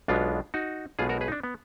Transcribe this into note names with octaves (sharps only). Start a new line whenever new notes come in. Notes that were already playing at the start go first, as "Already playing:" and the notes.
B1 B2 G#3 B3 D4 F4
D#4 F#4
B1 B2 G#3 B3 F4 G#4
F#4 A#4
G#4 B4
D#4
D4
B3